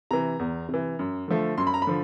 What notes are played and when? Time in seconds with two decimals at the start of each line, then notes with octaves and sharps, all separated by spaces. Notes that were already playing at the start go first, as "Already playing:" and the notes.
0.11 C3 E3 A#5
0.39 E2
0.69 C3
0.74 E3
0.99 F#2
1.28 D3 F3 A3
1.57 F#2 C6
1.67 B5
1.74 A#5
1.82 B5
1.87 D3 F3